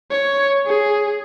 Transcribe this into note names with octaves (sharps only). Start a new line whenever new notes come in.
C#5
G#4